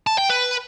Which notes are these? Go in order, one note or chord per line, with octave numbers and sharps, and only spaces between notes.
A5
G5
B4